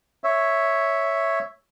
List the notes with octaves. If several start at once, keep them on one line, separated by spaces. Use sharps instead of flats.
C#5 E5